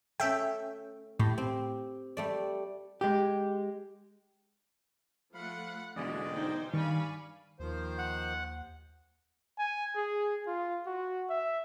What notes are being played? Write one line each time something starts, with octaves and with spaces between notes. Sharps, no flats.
A3 C#4 E5 G5
A2 G4
C4
G3 A3 D5
G#3 G4
F3 A3 F5 F#5 B5
E2 B2 D3 G#3 F#4 G#4 D5
D#4 C5 G5
G2 D#3 D5 F5 G#5 B5 C#6
D#2 D#3 F3 C5
F#5
G#5
G#4
F4
F#4
E5